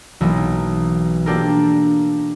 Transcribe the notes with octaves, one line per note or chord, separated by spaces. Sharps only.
B1 E3 A#3 A4
A#3 D4 F4 G4 A4 A#4